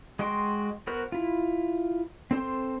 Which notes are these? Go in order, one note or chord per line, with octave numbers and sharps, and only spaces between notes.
G#3 F#4 D#5 G5 C6
B3 F#4 A#4 C5 F#6
E4 F4
C4 A4 C5 C6